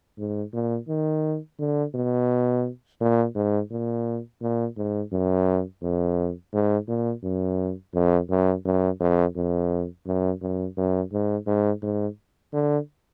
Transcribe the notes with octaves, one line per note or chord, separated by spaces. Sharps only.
G#2
A#2
D#3
D3
B2
A#2
G#2
A#2
A#2
G#2
F#2
F2
G#2
A#2
F#2
F2
F#2
F#2
F2
F2
F#2
F#2
F#2
G#2
G#2
G#2
D3